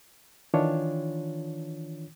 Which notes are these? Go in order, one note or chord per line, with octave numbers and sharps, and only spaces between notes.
D#3 E3 D4 F4 C#5